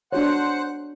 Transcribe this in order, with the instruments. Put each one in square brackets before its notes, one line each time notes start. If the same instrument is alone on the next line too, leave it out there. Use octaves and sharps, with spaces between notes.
[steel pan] D4 F#4 C#5 [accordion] C5 F#5 F#6